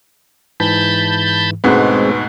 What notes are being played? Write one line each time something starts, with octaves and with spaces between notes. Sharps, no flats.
G#2 E3 A5 B5 G6
D2 G#2 B2 G#3 C4 B4